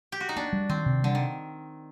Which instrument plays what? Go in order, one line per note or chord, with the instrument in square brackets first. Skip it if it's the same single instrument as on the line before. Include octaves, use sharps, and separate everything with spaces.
[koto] G4
F#4
D#4
[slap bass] A#3 [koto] D4
[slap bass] G3
[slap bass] D#3 [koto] C4
[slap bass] C3
[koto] D3 [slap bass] G3
[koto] D#3